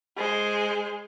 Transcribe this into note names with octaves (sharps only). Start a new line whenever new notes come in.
G#3 C5